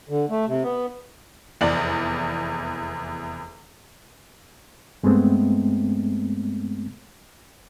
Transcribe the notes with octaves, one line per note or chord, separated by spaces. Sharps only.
D3
A3
C3
B3
F1 E2 D5 F#7
G2 G#3 A3 B3 C4